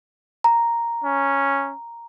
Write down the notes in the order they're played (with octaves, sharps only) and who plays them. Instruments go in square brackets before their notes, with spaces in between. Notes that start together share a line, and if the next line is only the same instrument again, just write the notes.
[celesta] A#5
[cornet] C#4